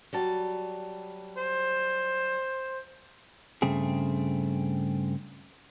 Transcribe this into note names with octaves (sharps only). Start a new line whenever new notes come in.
F#3 G3 A5
C5
G2 C#3 A3 C4 G#4